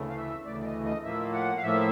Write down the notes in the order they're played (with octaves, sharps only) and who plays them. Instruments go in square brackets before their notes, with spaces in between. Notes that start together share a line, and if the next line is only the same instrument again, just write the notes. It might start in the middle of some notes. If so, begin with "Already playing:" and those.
Already playing: [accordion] D2 C#3 E3 A3
F5
E5
D2 C#3 E3 A3 D5
D5
D#5
D#5
A2 F3 A#3 E5
F#5
F5
A2 F3 A#3 E5